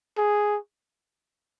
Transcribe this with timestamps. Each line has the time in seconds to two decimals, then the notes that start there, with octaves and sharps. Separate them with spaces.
0.18 G#4